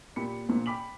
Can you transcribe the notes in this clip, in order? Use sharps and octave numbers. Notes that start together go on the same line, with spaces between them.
A#2 G4 B5 C#7
A#1 A#2
G5 B5 D6 B6 F#7